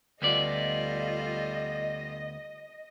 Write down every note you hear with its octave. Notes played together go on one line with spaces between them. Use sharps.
D2 G3 B3 F4 A4 D5 D#5